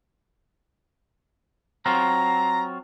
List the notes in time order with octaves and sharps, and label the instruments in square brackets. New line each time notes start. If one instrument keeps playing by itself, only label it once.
[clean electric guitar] F#3 C4 F4 [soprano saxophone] A#5